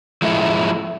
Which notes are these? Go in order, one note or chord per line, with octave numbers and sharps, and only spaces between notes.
F3 G#3 E4 A4